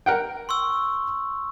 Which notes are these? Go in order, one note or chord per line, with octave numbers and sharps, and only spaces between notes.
A#4 F#5 G5
C6 C#6 E6